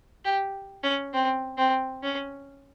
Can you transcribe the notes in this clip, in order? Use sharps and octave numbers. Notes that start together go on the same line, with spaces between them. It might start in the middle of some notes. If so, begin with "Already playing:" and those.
G4
C#4
C4
C4
C#4